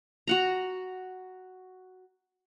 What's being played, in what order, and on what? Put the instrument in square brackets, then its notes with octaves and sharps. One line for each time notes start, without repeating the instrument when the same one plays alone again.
[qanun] F#4 F#5 A#5